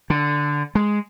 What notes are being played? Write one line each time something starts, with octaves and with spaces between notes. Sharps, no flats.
D3
G#3